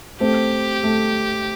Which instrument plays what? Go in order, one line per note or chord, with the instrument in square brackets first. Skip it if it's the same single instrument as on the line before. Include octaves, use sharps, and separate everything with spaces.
[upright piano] A3 C4 [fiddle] G4
[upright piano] A3